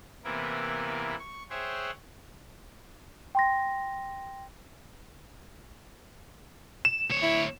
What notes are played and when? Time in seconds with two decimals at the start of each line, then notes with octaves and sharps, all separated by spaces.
0.24 C3 E3 A#3 B3 E4 A#4
1.20 C#6
1.50 G#4 C5 C#5 E5 F#5 G5
3.35 G5 C6 A#6
6.85 E7
7.10 D2 C#5
7.23 E4